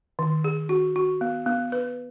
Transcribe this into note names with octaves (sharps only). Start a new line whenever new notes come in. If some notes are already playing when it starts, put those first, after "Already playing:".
D#3
G#4
F#4
F#4
B3
B3
B4